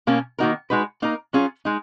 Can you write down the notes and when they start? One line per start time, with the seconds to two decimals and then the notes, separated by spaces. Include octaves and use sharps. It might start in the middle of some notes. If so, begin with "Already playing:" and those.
0.07 B2 A#3 C#4
0.38 D#3 A#3 D#4 F#4 A#4
0.70 G#3 D#4 F#4 B4
1.02 A#3 D#4 A#4
1.33 F#3 C#4 F4 G#4
1.65 G#3 D#4